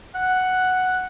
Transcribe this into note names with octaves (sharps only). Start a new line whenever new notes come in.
F#5